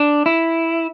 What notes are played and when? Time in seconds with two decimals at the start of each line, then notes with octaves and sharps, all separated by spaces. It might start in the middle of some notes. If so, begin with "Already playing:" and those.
Already playing: D4
0.26 E4